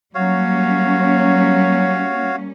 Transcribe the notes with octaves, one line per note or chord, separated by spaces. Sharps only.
F#3 G3 A#3 C#4 F#4 C#5 F5